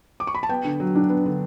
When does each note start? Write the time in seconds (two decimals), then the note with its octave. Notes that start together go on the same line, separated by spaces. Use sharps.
0.20 D6
0.27 C#6
0.35 B5
0.43 A5
0.49 B3 G5
0.64 D3
0.80 F#3
0.95 D4
1.10 B3
1.26 D3